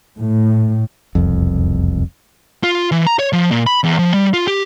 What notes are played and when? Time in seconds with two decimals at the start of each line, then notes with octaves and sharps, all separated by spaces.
0.17 A2
1.15 E1 C2 F2
2.64 F4
2.92 E3
3.07 A#5
3.19 C#5
3.33 F3
3.51 A#2
3.66 B5
3.84 E2
3.99 F3
4.14 G3
4.33 F4
4.48 G4